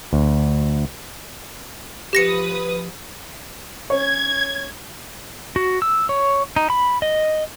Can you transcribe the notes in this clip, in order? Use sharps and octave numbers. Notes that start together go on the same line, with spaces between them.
D2
F3 G4 B4 D#6 A#6 C#7
C#4 C#5 G#6
F#4
E6
C#5
D#4
B5
D#5